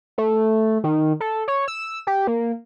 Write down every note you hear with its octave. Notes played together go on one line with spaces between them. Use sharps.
A3
D#3
A4
C#5
E6
G4
A#3